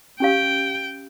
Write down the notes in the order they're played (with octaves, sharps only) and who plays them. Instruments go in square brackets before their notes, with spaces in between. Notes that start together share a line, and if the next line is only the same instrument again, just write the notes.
[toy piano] C#4 G4 F5 [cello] G5